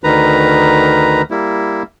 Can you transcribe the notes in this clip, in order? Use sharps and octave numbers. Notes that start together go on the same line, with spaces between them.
D2 D#3 B4 A#5
G3 A#3 E4